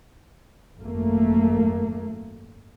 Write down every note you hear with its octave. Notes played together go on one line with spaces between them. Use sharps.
G#1 F#2 A3 A#3